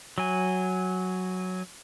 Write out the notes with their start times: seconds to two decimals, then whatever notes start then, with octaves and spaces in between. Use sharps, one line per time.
0.18 F#3 G#5